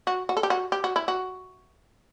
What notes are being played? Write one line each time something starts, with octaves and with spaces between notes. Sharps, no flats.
F#4
F#4
A4
G4
F#4
G4
F#4
E4
F#4